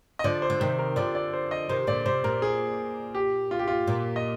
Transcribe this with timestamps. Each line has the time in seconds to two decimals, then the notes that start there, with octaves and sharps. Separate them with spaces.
0.19 D#5
0.24 D3 F3 D5
0.42 C5
0.50 D3
0.60 C3 D#3 C5
0.79 A#4
0.96 D3 F3 D5
1.15 D5
1.34 C5
1.51 D#5
1.69 C3 D#3 C5
1.87 A#2 D3 D5
2.06 C3 C5
2.24 A#2 A#4
2.42 G#4
3.15 G4
3.51 F4
3.59 G4
3.68 F4
3.87 A#2
4.16 D#5